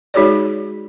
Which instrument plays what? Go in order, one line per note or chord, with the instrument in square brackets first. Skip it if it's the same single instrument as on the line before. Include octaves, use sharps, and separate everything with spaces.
[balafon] G#3 D#4 F#4 G#4 C#5 D5